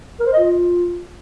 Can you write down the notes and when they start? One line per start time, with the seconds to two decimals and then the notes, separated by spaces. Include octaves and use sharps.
0.20 A#4
0.27 C5
0.33 D#5
0.39 F4